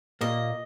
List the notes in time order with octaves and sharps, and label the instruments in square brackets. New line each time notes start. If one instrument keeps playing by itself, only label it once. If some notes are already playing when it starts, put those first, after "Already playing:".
[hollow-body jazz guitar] A#2 A#3 [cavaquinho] D#5